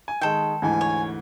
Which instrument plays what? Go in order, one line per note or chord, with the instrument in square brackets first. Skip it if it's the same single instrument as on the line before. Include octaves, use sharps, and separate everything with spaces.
[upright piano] G#5
[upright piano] D#3 G#3 [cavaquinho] A4 G5
[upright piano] D2 G#2 E3 [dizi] G#5
[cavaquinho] C#5